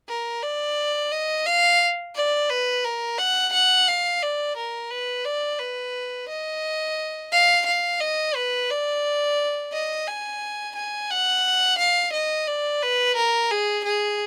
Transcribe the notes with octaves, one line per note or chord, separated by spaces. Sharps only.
A#4
D5
D#5
F5
D5
B4
A#4
F#5
F#5
F5
D5
A#4
B4
D5
B4
D#5
F5
F5
D#5
B4
D5
D#5
G#5
G#5
F#5
F5
D#5
D5
B4
A#4
G#4
G#4